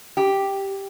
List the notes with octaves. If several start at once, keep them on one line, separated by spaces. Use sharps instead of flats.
G4